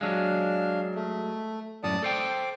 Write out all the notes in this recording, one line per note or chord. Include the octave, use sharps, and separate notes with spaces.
F#3 G#3 D4 F5
A3
F#2 A2 D5 A5 D#6
A4 C5 G5 D6